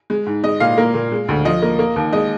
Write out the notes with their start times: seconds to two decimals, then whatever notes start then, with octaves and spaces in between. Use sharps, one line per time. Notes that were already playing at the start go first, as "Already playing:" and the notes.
0.10 G#3
0.26 G#2
0.44 G#3 D#5
0.60 A#2 F5
0.78 A#3
0.94 A#2
1.12 G#3
1.29 D2
1.45 F3 D#5
1.62 A#3
1.79 A#3
1.96 D#2
2.13 G#3 D#5